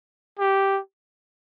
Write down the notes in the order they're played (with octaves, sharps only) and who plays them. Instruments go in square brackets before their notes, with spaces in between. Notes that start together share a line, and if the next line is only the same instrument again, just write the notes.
[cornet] G4